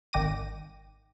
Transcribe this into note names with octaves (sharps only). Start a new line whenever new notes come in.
G#1 D#3 G5 D6 A#6 D#7